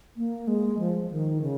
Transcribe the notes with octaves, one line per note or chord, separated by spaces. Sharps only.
A#3
G#3
F3
D#3
C#3